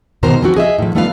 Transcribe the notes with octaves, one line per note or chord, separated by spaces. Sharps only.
G#2 B2 D#3 A#4 C5 A#5
E3 F3 C4 F#4
G#4 D#5 E5
A2 F3
G3 A3 B3 F4 B4 F5